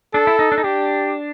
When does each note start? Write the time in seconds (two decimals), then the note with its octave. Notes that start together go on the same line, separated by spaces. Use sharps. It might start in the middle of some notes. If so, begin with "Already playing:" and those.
0.14 D4 A4
0.27 E4
0.39 D#4
0.52 D4
0.58 D#4
0.64 D4 G4